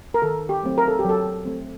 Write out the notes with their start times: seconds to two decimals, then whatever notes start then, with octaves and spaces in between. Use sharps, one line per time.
0.14 A#4
0.22 D#3 A4
0.49 G4
0.63 F#3 A3 C4
0.78 A#4
0.88 A4
0.99 G4
1.05 F#3 A4
1.45 A3 C4